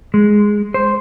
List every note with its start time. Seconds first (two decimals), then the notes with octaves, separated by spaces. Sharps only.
0.14 G#3
0.74 C5